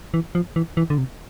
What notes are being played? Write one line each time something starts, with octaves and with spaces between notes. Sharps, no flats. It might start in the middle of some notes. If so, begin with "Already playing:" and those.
E3
F3
E3
E3
D3
C3